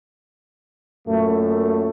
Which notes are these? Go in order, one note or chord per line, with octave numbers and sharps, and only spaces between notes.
F#2 A#2 A3